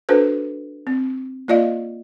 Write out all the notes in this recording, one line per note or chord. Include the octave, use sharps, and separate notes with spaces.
D4 F#4 A4 B4 C5
C4
A#3 F4 D5 D#5 F5